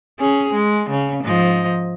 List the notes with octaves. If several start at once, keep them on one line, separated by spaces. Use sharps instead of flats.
C#4 G#4
G#3
C#3 C#4
G#2 F3 D#5